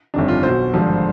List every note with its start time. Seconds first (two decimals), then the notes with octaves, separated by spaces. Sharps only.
0.14 G1 F2 D#3 D4
0.28 F4
0.43 B1 B2 C5
0.74 G#1 G2 D3 F3